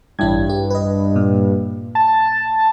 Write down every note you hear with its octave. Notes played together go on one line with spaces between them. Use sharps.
A1 G2 E4 G#6
G4
B4 D#5
A#2
A5